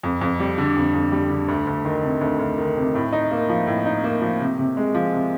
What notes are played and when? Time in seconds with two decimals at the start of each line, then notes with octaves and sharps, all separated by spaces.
0.03 F2
0.21 F2
0.40 G3
0.58 D3
0.76 F2
0.94 F2
1.12 G3
1.30 D3
1.48 D2
1.67 D2
1.85 D#3
2.03 C3
2.21 D2
2.39 D2
2.58 D#3
2.77 C3
2.95 A2
3.12 D#4
3.31 A#3
3.49 F3
3.67 A2
3.86 D#4
4.04 A#3
4.21 F3
4.40 C3
4.59 C3
4.77 G#3
4.95 F3
5.13 C3